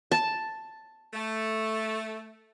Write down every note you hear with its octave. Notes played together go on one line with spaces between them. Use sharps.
A5
A3